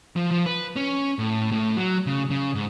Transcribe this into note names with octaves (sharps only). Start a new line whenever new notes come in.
F3
F3
B4
C#4
A2
A2
F#3
C#3
C#3
G#2